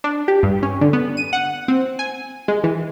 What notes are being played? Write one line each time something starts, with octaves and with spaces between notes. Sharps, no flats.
D4
G4
G2
C#4
D3
B3
D#7
F#5
C4
G#5
G#3
E3